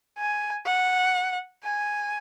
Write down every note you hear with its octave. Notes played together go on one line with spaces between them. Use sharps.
G#5
F#5
G#5